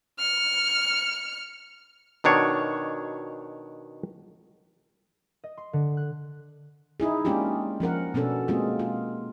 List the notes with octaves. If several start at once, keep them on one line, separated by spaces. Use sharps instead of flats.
F6 C#7
B2 D#3 D4 C#5
D#5
C6
D3
F#6
D#4 E4 G#4
G#3 A#3 C#4 D4 F4 G4
F3 C#4 A#4 F#5
B2 B3 C#4 D4 A4
G#3 A#3 C4 F4 G#4
F4